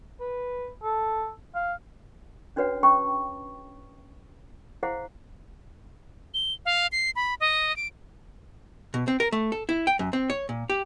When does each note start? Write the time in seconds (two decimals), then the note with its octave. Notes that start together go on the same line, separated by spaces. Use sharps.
0.21 B4
0.83 A4
1.55 F5
2.56 C#4 D4 F#4 B4 C#5 F#5
2.83 C#4 G#4 G5 A5 B5 C#6
4.83 E4 G#4 C5 F5 F#5
6.34 G7
6.66 F5
6.92 C7
7.16 B5
7.40 D#5
7.76 D7
8.94 B2
9.08 C4
9.20 A#4
9.32 A3
9.52 A4
9.69 E4
9.87 G5
9.99 F#2
10.13 C4
10.30 C#5
10.49 A#2
10.70 G4